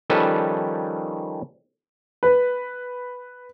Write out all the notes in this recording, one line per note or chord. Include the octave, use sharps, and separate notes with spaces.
D#3 F3 G3 C#4 A4 B4
B4